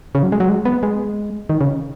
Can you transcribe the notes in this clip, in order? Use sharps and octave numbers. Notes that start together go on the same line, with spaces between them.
C#3
F#3
G#3
F#3
G#3
B3
G#3
D#3
C#3